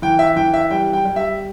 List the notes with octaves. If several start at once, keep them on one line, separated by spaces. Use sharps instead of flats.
E3 G5
E5
E3 G5
E5
G3 G5
G5
G3
E5